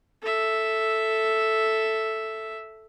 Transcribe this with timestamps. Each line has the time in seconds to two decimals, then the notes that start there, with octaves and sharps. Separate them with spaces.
0.22 A4 E5